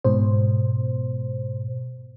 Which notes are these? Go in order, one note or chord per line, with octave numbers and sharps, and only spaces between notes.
G#2 B2 C5